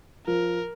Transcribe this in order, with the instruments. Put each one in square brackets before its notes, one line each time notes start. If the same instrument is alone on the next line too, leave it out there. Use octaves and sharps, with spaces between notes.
[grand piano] F3 [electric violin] A#4